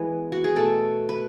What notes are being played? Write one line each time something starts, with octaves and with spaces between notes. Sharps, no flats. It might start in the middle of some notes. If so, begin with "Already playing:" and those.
Already playing: E3 G#3 B3 G#5
F#4
G#4
B2 A3 A4
B4